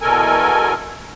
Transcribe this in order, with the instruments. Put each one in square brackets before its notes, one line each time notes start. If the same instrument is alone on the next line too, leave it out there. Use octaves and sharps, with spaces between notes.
[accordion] E2 B2 A4 A#4 G#5